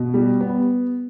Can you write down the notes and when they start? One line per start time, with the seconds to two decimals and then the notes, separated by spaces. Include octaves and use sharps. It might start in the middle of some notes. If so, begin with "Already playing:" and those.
Already playing: B2
0.14 G3
0.41 B3